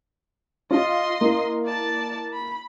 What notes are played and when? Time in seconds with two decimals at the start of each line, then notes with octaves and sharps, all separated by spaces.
0.71 F4 D#5 C6
1.21 A#3 E4
1.65 D5 A5
2.33 B5